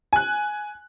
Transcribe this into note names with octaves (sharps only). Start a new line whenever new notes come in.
G#5 F#6